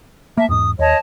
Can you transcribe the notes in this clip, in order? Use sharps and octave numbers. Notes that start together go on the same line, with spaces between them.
A#3 E5 A5
E2 G#2 D#6
D#2 C#5 D#5 A5